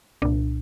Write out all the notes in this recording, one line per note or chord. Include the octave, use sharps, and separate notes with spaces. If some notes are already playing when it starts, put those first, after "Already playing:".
C2 A#2 D4